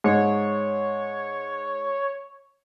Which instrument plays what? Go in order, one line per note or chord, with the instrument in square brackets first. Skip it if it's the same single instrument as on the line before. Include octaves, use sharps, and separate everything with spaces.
[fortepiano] G#2 [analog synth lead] C#5